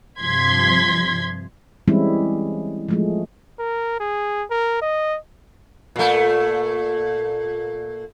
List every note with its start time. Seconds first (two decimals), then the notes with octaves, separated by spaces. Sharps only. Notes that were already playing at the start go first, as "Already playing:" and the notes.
0.21 G2 C3 F3 C6 G#6 B6
1.88 E3 G3 G#3 C4 C#4 E4
2.89 F3 G#3 A3
3.59 A#4
4.00 G#4
4.50 A#4
4.82 D#5
5.96 A#2 A3